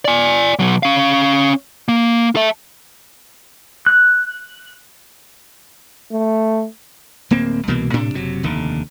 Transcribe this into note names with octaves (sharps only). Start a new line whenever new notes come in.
D5 G#5
B2 F#3
C#4 F5
A#3
A4 E5
F#6
A3
D1 A#3 C4
C2 B2 E3 A#3
A2 C3 D4
F#1 C3 F#3
F1 D#2 D3